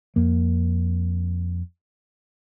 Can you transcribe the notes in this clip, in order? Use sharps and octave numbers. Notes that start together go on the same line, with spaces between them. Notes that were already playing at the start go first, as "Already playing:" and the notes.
F2 A#3